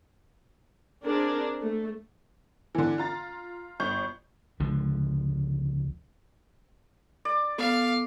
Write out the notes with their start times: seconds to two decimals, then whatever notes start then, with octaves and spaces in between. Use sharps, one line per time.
1.04 C4 D4 G#4 A#4
1.61 A3
2.75 D3 E3
2.98 F4 A#5 A6
3.80 G1 C#6 G6
4.60 C#2 D3 F3
7.25 D5
7.58 B3 A4 F5